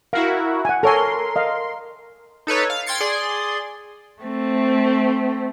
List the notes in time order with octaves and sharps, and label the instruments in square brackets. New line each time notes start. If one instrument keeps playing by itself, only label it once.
[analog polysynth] E4 F#4 A#4 [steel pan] F5
[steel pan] F#5 G#5
[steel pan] A4 C#5 G#5 [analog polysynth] A#4 C6
[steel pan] D#5 F5
[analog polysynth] D#4 A4 B4 C#5
F5
G5 C6 G#6 A6 C#7
G#4 D5 C6
[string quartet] A3 C4